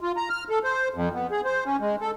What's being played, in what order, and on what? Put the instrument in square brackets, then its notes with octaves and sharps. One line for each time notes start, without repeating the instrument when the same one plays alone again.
[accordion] F4
A#5
F6
A4
C5
F2
B3
G#4
C5
C#4
G#3
A4